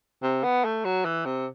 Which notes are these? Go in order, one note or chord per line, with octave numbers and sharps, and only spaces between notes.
C3
B3
A3
F#3
E3
C3